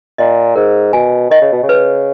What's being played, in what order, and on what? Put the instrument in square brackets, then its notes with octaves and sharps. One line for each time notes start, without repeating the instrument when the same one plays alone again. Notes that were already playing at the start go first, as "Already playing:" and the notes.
[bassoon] A#2 [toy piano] D#5
[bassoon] G#2 [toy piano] A#4
[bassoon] B2 [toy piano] G#5
[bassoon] D#3 [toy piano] D#5
[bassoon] C#3
B2
C#3
[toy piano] B4